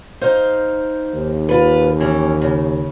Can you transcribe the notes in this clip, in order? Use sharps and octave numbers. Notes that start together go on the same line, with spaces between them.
D#4 C5 F5
D#2
F4 B4
E3 C#4
C#3